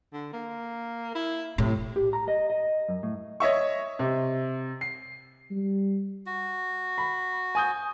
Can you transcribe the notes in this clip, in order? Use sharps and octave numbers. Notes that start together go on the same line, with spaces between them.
D3
A#3
E4
A2 C3
G4
A#5
D#5
D#5
F#2
A2
C#5 D#5 E5 C#6
C3
C7
G3
F#4
B5
G#5 D#6 G6